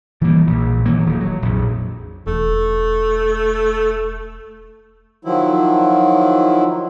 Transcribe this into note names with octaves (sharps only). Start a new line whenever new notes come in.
E3 F3 G3 A#3
A#1
D#3 E3 F#3 A#3
D#1
F#3
A#1 F2
E1 A3
D#3 F3 F#3 E4